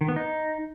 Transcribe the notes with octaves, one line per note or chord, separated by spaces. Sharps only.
D#3
B3
D#4